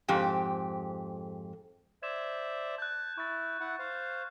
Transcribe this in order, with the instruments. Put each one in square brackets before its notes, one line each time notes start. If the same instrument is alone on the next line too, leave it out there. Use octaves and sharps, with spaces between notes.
[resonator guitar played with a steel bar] F2 G#2 G4
[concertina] C5 D5 E5 [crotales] G#6 E7
[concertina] A5 [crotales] F#6 G6
[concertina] E4 [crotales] C#6 A6
[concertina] E4 F#5
C5 F5